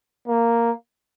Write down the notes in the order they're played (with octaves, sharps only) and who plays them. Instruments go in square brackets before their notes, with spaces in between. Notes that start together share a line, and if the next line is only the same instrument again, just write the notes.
[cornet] A#3